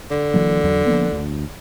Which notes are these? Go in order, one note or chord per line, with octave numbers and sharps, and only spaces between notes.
D3
E3 F#3 A#3
E2 F#3
F3 A#3 B3
D2